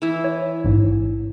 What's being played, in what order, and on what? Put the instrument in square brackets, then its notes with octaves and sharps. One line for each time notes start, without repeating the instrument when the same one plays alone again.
[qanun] E3 E4
[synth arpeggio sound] C#5
A1 G#2